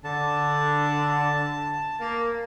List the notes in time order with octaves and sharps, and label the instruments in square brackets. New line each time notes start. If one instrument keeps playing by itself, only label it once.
[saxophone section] D3 [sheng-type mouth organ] A5
[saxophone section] A#3